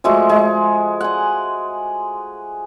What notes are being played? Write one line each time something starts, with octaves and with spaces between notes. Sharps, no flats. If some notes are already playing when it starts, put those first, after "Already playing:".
F3 G#3 A3 F#4
G#3
F#5 G#5